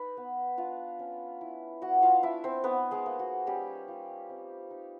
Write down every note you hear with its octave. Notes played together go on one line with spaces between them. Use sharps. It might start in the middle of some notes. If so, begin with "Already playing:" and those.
Already playing: D#4 B4
B3
D4 F4 F5
C#4
E4
B3 F#4 F#5
F4 F5
D4 E4 E5
C4 C5
B3 D#4 B4
G#3 G#4
A#3
F#4
G3 C#4 G4
F4
C4
D#4